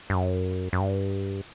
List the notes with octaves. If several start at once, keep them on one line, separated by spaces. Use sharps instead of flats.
G2
F#2
F#2
G2